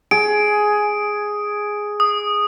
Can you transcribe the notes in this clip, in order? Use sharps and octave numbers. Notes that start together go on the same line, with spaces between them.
G#4 D7
D#6